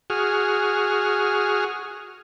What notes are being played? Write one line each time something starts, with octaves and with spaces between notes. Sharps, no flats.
F#4 G#4 F6